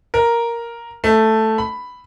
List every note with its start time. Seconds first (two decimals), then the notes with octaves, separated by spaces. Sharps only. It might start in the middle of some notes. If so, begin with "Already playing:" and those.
0.14 A#4
1.04 A3
1.58 B5